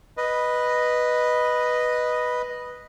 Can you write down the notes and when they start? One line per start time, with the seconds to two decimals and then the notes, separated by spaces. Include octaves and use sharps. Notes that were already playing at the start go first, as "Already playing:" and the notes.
0.17 B4 D#5